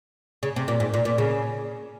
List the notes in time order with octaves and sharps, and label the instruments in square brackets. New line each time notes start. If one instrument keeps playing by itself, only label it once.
[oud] C#3
C3
A#2
G#2
A#2
A#2
C#3